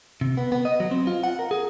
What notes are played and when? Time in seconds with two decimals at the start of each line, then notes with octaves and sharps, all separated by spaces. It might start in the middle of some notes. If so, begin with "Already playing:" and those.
0.21 C3
0.37 B3
0.52 B3
0.65 D#5
0.80 F#3
0.91 C4
1.07 F4
1.24 F#5
1.39 A#4
1.51 G#4